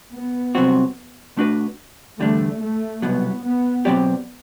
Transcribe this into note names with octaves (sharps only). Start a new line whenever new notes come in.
B3
C2 C3 F#3 C4 F#4
B2 A3 D4 F#4 B4
E2 D3 G3 A3 D4
A3
C2 B2 F#3 B3
B3
B2 F#3 C4 G4 D5